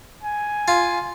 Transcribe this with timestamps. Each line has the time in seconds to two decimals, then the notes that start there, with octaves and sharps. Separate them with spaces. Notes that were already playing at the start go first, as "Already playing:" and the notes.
0.23 G#5
0.68 F4